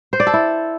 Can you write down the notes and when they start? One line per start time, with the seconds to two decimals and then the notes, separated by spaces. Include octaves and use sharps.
0.13 C5
0.20 D5
0.27 A4
0.34 E4